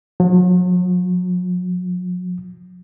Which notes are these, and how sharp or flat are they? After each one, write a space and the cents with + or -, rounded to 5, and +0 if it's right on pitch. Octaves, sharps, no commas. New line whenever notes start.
F#3 -45